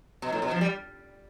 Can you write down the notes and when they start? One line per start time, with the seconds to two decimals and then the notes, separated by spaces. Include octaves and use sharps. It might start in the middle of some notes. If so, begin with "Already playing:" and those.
0.22 B2
0.32 A2
0.42 B2
0.51 F3
0.61 G3